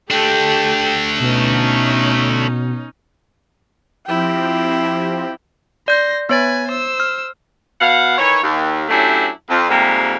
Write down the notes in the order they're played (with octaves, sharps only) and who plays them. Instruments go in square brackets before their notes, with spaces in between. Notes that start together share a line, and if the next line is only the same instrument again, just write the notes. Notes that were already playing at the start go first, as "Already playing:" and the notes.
[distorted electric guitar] A3 D4 [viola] G4 A4 [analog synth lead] G5
[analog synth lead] B2 [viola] C#4 D#4
[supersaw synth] F3 C4 G4 [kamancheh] E4 G5
[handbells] D5 G6 [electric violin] C6 A#6
[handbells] B3 C#5 A6 [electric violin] B4 G#5
[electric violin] C5 E6
[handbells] F6
[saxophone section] B2 F5 F#5
D#3 E3 E4 C#5
D#2
F#3 A3 C#4 D4 E4 G4
F2
F2 G#2 C3 G3 A#3